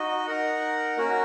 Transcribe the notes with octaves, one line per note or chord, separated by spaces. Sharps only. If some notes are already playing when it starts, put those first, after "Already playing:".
Already playing: D#4 F#4 D#5
D#4 A#4 F#5
A#3 C#4 F#4 A#4